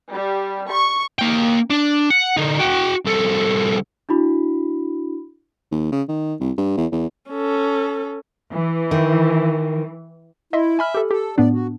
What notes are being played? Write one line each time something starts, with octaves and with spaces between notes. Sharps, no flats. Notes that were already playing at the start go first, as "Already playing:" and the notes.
G3
C#6
A#3 G5
D4
F#5
D3 D#4
F#4 G5
C2 A4
D4 E4 F#4 B5
D#2
C#3
D#3
C2
G2
E2
E2
C#4 A4
E3
D#3
E4 D#5 E5 C6
E5 G#5 B5 F6
G4 A4
G4 A4
A2 B3 D4 D5
F#4